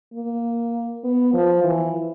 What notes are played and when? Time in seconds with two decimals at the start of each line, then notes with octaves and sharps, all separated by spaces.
0.13 A#3
1.04 B3
1.33 F3
1.64 E3